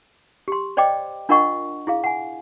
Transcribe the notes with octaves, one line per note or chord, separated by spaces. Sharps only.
G4 C6
C5 D5 D#5 G5 D6
D4 F4 A#4 D#5 F#5 C#6
E4 G#4 F5
F#5 G#5